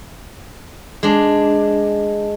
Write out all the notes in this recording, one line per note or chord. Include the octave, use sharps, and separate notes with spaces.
G#3 D4